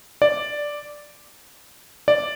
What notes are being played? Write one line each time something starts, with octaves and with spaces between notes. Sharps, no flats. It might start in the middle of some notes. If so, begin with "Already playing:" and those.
D5
D5